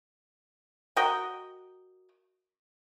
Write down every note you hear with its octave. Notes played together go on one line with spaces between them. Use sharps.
F#4 A#4 D#5 G5